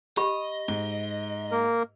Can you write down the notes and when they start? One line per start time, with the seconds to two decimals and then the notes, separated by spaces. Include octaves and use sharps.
0.17 G4 D#5 B5
0.68 G#2 G7
1.51 A#3 A#4